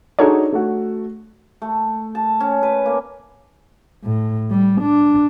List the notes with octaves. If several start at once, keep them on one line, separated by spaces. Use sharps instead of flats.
D4 D#4 F#4 G#4 A4 C#5
A3 F#4
A3
A5
C#4
B4
A#3
A2
G3
D4